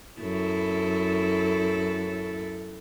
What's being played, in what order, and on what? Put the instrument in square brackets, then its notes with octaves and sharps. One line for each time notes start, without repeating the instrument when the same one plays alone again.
[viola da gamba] F#2 E4 A4